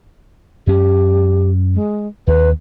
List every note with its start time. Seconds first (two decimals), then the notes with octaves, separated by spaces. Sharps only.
0.67 F#2 C#4 G4
1.74 G#3
2.27 D#2 B4